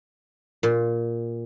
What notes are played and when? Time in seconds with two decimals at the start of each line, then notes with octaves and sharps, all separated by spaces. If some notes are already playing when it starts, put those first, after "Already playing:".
0.63 A#2